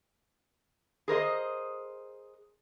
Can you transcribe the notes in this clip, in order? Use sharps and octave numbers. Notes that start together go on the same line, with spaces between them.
G#4 A#4 C5 D#5